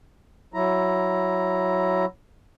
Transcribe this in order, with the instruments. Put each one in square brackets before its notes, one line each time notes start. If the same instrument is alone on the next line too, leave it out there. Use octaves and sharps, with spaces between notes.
[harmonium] F#3 E4 A#5